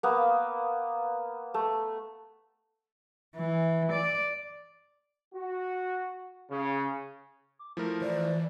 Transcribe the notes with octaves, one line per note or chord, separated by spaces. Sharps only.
A#3 B3
A3
E3
D5
F#4
C#3
D6
F3 A3 E4 A#4
E3 C5 D5